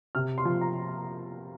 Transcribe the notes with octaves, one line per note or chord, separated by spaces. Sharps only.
C3 F6
C6
F3
A#5